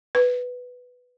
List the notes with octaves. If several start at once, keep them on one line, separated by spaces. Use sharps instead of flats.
B4